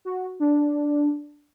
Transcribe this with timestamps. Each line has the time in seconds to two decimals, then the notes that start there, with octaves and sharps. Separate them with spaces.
0.05 F#4
0.40 D4